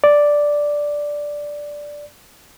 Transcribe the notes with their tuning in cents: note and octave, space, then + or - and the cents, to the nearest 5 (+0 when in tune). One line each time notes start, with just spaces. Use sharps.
D5 +0